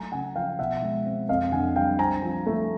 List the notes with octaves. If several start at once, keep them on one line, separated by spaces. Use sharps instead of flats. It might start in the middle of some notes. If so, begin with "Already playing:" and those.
Already playing: F#3 A3 G#5 A#5
C#3 F#5 G#5
F3 F5 G5
B2 E5 F#5
G#3
C4
F2 D#5 F5
D3 F#5 G#5
G3 F5 G5
C4 G#5 A#5
F3
A3